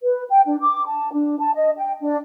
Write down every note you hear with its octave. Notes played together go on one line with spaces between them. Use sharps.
B4
G5
D4
D6
A5
D4
A5
D#5
G5
D4